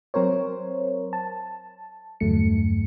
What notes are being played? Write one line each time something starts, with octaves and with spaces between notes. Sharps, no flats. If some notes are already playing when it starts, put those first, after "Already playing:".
F#3 C4 A#4 C5 C#5
A5
E2 G2 D3 F#3 A3 C#7